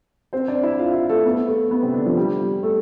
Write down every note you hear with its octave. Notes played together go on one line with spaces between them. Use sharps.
C4 C5
D4 D5
E4 E5
F4 F5
E4 E5
A3 A4
B3
A3
B3
C3 C4
D3 D4
F3 F4
G3 G4
A3 A4